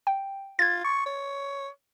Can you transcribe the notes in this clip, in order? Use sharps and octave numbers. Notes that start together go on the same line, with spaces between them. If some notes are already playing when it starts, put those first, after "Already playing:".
G5
F4 G#6 A6
C#6
C#5